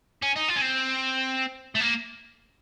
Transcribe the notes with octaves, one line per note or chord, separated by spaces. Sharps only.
C#4
D#4
F4
C#4
C4
A3
A#3